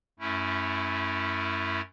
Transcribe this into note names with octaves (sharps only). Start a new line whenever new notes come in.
F#2 A3 C#4 E4